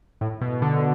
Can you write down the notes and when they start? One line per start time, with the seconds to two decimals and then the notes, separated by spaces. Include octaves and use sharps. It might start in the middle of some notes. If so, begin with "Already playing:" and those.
0.21 A2
0.41 B2
0.62 D3